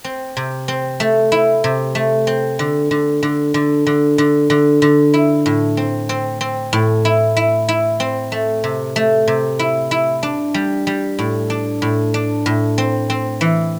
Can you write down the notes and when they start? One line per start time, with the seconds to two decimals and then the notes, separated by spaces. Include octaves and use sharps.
0.04 C4
0.37 C3
0.68 C4
1.00 A3
1.32 E4
1.64 C3
1.95 A3
2.27 C4
2.59 D3
2.91 D3
3.23 D3
3.54 D3
3.87 D3
4.18 D3
4.50 D3
4.82 D3
5.14 E4
5.46 A2
5.77 C4
6.09 C4
6.41 C4
6.73 A2
7.05 E4
7.37 E4
7.69 E4
8.00 C4
8.32 A3
8.64 C3
8.96 A3
9.28 C3
9.59 E4
9.91 E4
10.23 D4
10.54 G3
10.87 G3
11.19 A2
11.50 D4
11.82 A2
12.14 D4
12.46 A2
12.78 C4
13.10 C4
13.41 E3